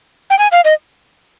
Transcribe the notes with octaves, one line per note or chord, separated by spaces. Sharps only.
G5
G#5
F5
D#5